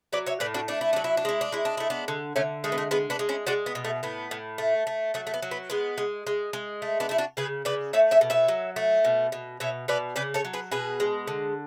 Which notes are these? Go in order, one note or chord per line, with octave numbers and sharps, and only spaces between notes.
F#3 B4 D5
C#5 E5
A2 B4 D5
D4 F#4
A3 D4
E4
F#3 D4
E4
D4
G#3 E4
D4
G#3 E4
D4
A3 E4
B3 D4
D3
D3 A3 C#4
G#3 A3
B3
A3
G#3 B3
B3 D4
G#3
C#4 E4
G#3 D4 F#4
B3
B2
A3
A2 B3
A2
A3
A3
F#3 A3
A3
B3
F#3
B3
G#3 B3
G#3
G#3
G#3
A3
B3 D4
A3 E4
D4 F#4
C#3 G#4 B4
C#3 B4 D5
A3 C#5 E5
C#5 E5
B2
C#5 E5
F#3
A3
B2
B2
B2 C#5 E5
B2 B4 D5
C#3 B4 D5
A4 C#5
F#3
G#4 B4
B2 G#4 B4
G#3
D3